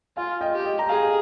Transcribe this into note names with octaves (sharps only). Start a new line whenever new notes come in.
F4 F5 G#5
D#5 G5
G4
D#5 G5
A#5
G#4 F5 G#5